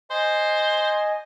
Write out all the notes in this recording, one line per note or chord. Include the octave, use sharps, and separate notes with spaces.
C5 D#5 G#5